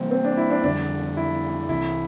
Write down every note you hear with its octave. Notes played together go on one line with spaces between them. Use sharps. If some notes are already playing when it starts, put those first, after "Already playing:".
Already playing: C3 E3 G3 A#3 C4
C4
D4
E4
D4
F2 D3 G3 D4
E4
C2 C3 E3 E4